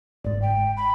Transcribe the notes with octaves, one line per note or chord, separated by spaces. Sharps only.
G1 G#2 D5
G5
B5